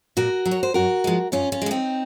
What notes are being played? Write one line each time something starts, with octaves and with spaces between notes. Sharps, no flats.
A#2 F#4 A#4
F#3
C#5
C5
F#2 F#4 A#4
F3 G#3
F#2 C#4 F4
C#4 F4
G#3
F3 C4 D#4